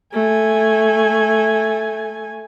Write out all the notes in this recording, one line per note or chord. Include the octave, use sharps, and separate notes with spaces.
A3 G#5